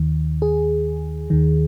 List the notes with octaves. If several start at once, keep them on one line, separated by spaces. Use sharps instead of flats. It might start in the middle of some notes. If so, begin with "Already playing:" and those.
Already playing: D#2 D#3
G#4
D#2 D#3